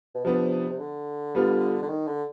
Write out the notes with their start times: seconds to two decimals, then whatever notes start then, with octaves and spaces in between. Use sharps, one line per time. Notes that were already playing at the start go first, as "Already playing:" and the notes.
0.15 B2
0.24 C3 F3 B3 D4
0.70 C3
0.79 D3
1.35 G3 B3 D4 F4
1.82 D3
1.89 D#3
2.07 D3